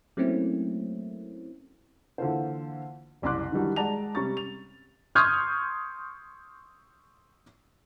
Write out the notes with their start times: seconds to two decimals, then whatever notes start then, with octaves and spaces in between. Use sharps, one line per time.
0.17 F#3 A3 A#3 C4 C#4 E4
2.18 D3 E3 A#3 F4 A4 C5
3.22 F#1 C2 C#4 C6 D6 F#6
3.52 D#3 E3 F#3 G3 D4
3.76 G#3 D5 F#5 A5 A#5 F7
4.15 C3 G3 C#4 A#5 C#6 A6
4.37 F7
5.15 C6 C#6 D#6 F6 G6 G#6